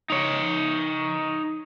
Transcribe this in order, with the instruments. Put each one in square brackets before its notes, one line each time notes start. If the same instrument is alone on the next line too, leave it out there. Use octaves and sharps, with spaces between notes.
[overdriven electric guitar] D#4 C#5